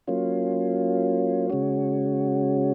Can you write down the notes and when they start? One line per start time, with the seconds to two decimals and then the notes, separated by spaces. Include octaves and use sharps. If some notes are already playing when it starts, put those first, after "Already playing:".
0.07 F#3 A#3 C#4 F4
1.50 C#3 G#3 C#4 F#4